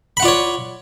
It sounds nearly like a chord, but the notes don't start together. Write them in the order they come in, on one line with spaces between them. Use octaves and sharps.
B5 F#5 F4 D5 C#5